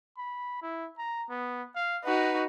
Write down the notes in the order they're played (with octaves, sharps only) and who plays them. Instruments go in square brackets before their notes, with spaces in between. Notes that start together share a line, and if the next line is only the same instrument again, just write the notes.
[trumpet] B5
E4
A#5
B3
F5
[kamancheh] D#4 F#4 [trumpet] B4